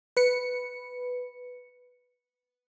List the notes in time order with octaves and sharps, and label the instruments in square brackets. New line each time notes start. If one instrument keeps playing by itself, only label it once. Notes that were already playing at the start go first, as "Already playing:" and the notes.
[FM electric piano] B4 C#7